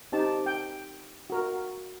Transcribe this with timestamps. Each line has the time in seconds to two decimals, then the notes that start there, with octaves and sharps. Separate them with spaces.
0.12 C4 D#4 G4 A5
0.46 G5
1.30 F#4 A#4